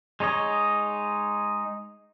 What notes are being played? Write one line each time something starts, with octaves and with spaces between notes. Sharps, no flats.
G#3 D#4 C#5 D#5